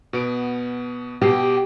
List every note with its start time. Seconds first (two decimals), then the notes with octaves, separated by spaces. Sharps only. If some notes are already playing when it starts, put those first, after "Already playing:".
0.13 B2 B3 D7
1.21 B2 G4 C7